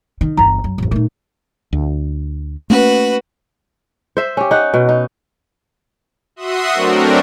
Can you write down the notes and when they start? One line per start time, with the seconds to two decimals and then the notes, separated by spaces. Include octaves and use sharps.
0.21 D#3
0.37 G1 E2 A#5
0.64 F#2
0.78 A1 F2
0.91 A#2 A3 D#4
1.73 D2
2.70 A3 A#3 C#4 F#4 B4
4.17 C5 E5
4.37 C#4 G4
4.51 D#4 F#5
4.74 B2
4.89 D#4
6.36 F#4 E5 F#5 C6 D#6
6.73 F#3 A3 C4 D4 F#4 A#4